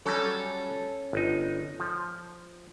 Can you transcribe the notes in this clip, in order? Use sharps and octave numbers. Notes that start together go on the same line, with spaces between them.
F#3 G3 C#4 A4
G1 D#4
F3